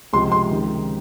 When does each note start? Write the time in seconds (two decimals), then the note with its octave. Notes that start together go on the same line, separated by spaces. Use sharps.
0.13 C#2 C3 F3 C6
0.32 C6
0.51 C#2 C3 D#3